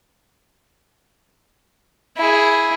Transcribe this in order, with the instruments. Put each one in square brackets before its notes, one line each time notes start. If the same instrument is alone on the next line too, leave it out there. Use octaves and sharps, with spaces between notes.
[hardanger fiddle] E4 G#4